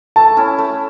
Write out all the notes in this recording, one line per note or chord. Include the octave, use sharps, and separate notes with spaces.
A3 A5
C#4 E4
A3